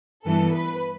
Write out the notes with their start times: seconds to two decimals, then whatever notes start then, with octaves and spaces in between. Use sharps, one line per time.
0.24 G2 E3 B3 A4
0.52 B4